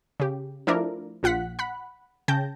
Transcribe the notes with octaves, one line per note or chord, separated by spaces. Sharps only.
C#3 G4
F3 A3 D4 E4 A#4 D5
A#1 F4 F#5 F#6 B6
F#5 B5 F#6
C#3 G5 A5 G6 A#6